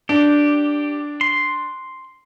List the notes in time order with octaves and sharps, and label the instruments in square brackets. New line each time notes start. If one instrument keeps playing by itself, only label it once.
[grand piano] D4 [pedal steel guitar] G4
[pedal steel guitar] C6